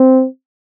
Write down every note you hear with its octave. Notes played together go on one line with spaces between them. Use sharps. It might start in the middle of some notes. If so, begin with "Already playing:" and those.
Already playing: C4